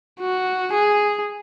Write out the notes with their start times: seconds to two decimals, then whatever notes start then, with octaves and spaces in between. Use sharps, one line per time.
0.20 F#4
0.73 G#4